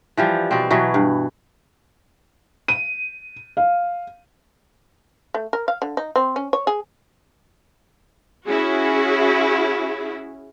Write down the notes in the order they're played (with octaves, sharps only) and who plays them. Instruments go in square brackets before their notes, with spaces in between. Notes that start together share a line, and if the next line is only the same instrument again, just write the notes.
[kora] E3 F3 G3
B2 C4
B2 E3 F#3
G2
[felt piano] D#7
F5
[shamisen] A3
A#4
F5
D3
D#4
C4
C#4
C#5
G#4
[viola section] C#4 E4 F#4 G#4